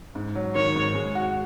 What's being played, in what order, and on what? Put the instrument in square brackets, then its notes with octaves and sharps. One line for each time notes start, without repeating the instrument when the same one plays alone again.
[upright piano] G#2
F#3
[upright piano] D#3 [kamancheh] C#5
[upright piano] G#2
G#3
F#4